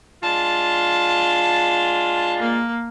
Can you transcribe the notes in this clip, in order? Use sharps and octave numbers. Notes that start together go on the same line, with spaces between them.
G#3 D4 F4 A5
A#3